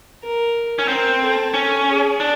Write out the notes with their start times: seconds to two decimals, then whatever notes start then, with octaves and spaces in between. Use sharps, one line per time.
0.22 A#4
0.79 C#4
0.88 C4 A#4
1.21 A4
1.54 C#4
1.88 G#4
2.20 D4